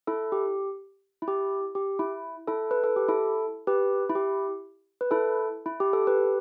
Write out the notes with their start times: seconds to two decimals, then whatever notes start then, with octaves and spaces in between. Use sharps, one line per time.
0.07 E4 A4
0.32 G4
1.22 E4
1.28 G4
1.75 G4
1.99 E4
2.48 E4 A4
2.71 B4
2.84 A4
2.96 G4
3.08 E4 A4
3.67 G4 B4
4.09 E4
4.15 G4
5.01 B4
5.11 E4 A4
5.66 E4
5.80 G4
5.93 A4
6.07 G4 B4